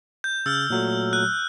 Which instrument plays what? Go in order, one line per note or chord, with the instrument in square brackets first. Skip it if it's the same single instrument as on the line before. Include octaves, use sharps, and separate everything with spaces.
[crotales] G6
[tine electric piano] C#3 A6 [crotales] E6 F6 G6
[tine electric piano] A#2 F#3 A3
[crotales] F#6